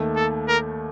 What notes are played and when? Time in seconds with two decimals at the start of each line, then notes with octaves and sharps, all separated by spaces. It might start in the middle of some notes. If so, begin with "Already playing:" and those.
Already playing: D#2 D#3 A3
0.17 A4
0.48 A#4